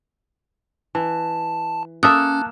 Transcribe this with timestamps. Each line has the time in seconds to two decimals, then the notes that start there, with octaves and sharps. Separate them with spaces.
0.95 E3 A5
2.03 A#3 C#4 A4 E5 A5 D#6 F#6